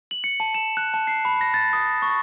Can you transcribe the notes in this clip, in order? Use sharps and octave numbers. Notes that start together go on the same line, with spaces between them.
F#7
C#7
A5
E7
F#6
A5
C7
B5
A#6
A6
D#6
C#6